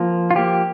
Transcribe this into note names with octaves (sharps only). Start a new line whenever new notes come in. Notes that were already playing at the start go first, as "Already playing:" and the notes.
Already playing: F3 A#3
F4
F3 A#3 G4